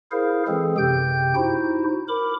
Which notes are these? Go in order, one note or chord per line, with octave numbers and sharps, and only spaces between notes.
E4 G#4 A#4 C5 F5
E3 G#3 C4 G#4 A4
F#2 C3 G4 G5 G6
D#4 E4 F#4 C5
A#4 B5 D6